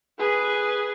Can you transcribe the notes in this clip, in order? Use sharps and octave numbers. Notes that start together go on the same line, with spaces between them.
G#4 B4